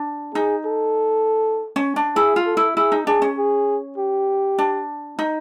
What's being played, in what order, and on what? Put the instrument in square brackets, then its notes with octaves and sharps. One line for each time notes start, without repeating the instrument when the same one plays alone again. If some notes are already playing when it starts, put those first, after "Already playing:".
Already playing: [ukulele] D4
[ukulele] D#4 [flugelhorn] G#4
[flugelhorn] A4
[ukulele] C#4
D4
[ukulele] E4 [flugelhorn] G#4
[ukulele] F4
[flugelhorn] A4
[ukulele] E4
[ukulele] E4 [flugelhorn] G#4
[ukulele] D#4
[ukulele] D4 [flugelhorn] G#4
[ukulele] C#4
[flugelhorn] G#4
G4
[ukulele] D4
D#4